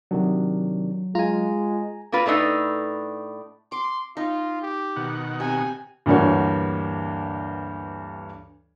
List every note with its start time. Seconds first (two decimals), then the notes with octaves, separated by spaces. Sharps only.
0.11 C3 D#3 F#3 D4
1.15 G#3 F4 G#5 A#5
2.12 A#3 D4 F4 B4
2.26 A2 A3 D4 D#4 B4
3.72 C6 D6
4.17 D#4 F4
4.62 G4
4.96 B2 D#3 F#5
5.40 C3 G#5
6.06 D2 G2 E3 A#3 F#4 C#5